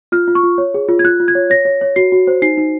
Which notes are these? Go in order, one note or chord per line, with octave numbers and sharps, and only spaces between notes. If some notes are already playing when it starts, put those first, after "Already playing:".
F4 F6
F4
C#6
F4
C#5
G#4
F4
G#6
F4 F#6
F4
G#6
C#5
C#5 A#6
C#5
C#5
F#4 C7
F#4
C5
D#4 C7
D#4